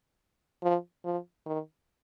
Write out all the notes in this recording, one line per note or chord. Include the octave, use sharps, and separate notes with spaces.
F3
F3
D#3